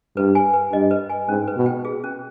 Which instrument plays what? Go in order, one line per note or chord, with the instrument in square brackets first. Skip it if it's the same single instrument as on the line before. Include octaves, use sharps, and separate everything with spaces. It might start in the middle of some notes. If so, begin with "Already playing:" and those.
[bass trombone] G2 [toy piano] B4
[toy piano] G#5
B4
[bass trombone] G2 [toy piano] D#5
[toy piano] B4
G#5
[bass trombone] G#2 [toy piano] C#4
[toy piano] B4
[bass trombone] B2
[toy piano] G5
G#4
C#4